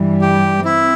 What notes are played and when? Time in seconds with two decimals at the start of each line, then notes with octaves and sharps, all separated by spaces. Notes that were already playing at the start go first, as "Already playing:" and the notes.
Already playing: G2 E3 G3
0.21 G4
0.65 C4 E4